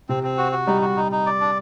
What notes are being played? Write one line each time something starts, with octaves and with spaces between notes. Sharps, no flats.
C3 C4
C4
F#4
F#4
G3 D#4
F#4
D#4
D#4
D5
D4